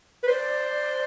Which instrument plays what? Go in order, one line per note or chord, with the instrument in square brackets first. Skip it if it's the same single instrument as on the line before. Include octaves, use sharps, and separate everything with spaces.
[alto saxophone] B4
[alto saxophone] C5 [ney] D5